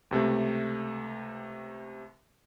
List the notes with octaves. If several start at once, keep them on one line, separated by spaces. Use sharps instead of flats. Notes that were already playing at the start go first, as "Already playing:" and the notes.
C#2 C3 A3